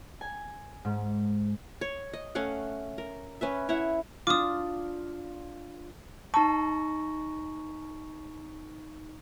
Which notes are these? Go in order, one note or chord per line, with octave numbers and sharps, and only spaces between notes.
G#5
G#2
C#5
D#5
A3 C#4 F5 F#5
A#4
C#4 B4 E5
E4 C#5 E5 F#5
D4 F4 D6 D#6
D#4 A5 A#5 C#6